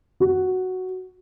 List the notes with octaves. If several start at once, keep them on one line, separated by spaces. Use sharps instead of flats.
F#4